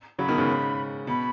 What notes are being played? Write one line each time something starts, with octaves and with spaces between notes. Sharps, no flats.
C#3 F#3 B5
B2 D#3
G#2 C#3
B2 B5